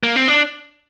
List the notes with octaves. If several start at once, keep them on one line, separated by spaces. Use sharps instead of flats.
A#3
C4
D4